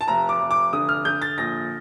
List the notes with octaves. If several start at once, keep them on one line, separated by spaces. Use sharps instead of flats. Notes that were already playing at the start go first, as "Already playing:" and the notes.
A5
F1 A#5
D6
F1
D6
D3 D#6
F6
D3 G6
A6
A#1 A#6